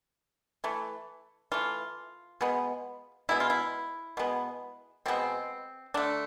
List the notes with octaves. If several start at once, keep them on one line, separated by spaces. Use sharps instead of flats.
E3 A3
E3 A3 F4
B2 G#3 B3
B2 G#3 B3 E4
F4
E4
B2 G#3 B3
B2 G#3 B3 C4
D3 A3 D4